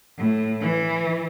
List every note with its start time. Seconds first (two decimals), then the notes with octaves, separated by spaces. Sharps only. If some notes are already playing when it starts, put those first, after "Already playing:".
0.18 A2
0.61 E3